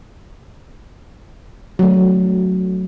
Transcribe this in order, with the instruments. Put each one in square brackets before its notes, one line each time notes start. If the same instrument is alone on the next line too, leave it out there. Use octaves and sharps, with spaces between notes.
[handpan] F#3 A3